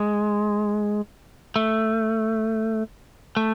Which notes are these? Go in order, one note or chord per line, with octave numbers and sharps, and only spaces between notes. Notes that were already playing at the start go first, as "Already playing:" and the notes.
Already playing: G#3
A3
A3